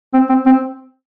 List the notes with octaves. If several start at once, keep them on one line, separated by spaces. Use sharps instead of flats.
C4
C4
C4